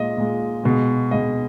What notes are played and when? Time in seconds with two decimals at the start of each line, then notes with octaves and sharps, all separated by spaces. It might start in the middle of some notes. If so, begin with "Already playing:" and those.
Already playing: A#2 G#3 D#5
0.17 A#2 G#3
0.64 B2 G#3
1.11 B2 G#3 D#5